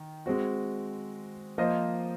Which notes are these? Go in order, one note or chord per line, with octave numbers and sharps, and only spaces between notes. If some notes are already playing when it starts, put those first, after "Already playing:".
Already playing: D#3
G#3 C4 F#4
F3 A#3 F4 C5 D#5